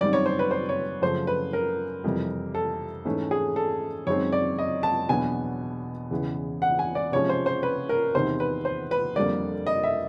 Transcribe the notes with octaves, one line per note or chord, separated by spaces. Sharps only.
F#2 D#3 G3 C4 D5
C#5
C5
B4
C5
C#5
F#2 C#3 F3 A3 C5
B4
A#4
F2 C3 E3 G3
A4
G#2 E3 A3 C#4
G#4
A4
F#2 D#3 G#3 C4 C#5
D5
D#5
A5
E2 B2 F#3 B3 D4 G#5
E2 C#3 E3
F#5
G#5
D5
C3 F3 G#3 C#4 C#5
C5
C5
B4
A#4
E2 C3 D#3 C5
B4
C5
B4
F2 D3 G3 A#3 D5
D#5
E5